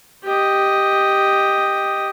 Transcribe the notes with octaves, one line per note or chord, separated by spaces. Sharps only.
G4 D#5